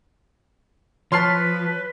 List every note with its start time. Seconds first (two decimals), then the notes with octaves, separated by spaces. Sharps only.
1.12 F3 B4 C#5 A5 C6 F6 C7